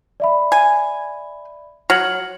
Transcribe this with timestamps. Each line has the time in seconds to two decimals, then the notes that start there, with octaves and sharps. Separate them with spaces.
0.20 D5 E5 B5
0.52 G#5
1.90 F#3 F6 C#7 F#7